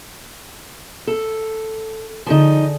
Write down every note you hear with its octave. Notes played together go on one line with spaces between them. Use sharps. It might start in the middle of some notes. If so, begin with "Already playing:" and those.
A4
D3 F3 D#4 G#4 A5